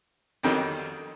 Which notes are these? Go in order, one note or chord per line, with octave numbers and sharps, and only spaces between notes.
F2 D3 D#3 F#3 G3